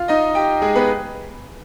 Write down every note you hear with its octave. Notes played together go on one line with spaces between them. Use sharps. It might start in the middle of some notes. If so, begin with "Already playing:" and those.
Already playing: F4 F5
D#4 D#5
G4 G5
G#3 G#4
B3 B4